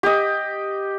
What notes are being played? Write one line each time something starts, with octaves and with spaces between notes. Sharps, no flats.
G4 D#5